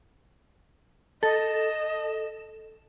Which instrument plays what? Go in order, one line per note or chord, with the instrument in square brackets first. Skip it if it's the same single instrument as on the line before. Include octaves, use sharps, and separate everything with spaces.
[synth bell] A4 [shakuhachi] D#5